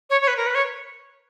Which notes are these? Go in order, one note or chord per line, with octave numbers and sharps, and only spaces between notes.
C#5
C#5
B4
A#4
B4
C#5